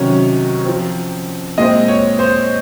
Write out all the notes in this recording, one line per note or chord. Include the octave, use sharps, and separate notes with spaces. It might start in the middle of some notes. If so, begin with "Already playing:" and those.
Already playing: C3 D#3 F#3 C#4 C#5
F3 C4
A#2 G#3 C4 D#5
C#5
C5